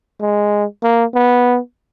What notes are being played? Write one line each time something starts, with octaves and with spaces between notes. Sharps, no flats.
G#3
A#3
B3